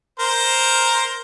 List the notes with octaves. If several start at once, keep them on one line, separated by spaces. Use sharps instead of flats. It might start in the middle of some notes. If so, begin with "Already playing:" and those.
A#4 C5